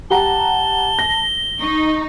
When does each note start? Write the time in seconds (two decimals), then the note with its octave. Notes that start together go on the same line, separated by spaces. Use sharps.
0.10 G4 F#5 A5 A#5 G7
0.99 A#6
1.61 D#4 C#6